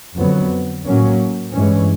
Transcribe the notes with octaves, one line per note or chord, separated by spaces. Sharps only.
F2 D3 F#3 B3
A2 F#3 A#3 C#4
G2 E3 G#3 C#4